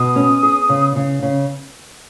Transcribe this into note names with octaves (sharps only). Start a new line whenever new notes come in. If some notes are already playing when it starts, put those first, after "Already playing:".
Already playing: B2 D#6
C#4
G#4
C#3
C#3
C#3